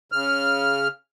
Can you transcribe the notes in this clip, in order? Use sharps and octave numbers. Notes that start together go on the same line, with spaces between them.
C#3 F6